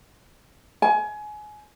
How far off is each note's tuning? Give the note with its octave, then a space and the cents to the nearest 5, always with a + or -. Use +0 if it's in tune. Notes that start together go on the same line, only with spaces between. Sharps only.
G#5 +25